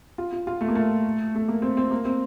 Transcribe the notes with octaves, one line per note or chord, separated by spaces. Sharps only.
F4
F4
F4
A3
A#3
A3
A3
A#3
C4
C4
A#3
C4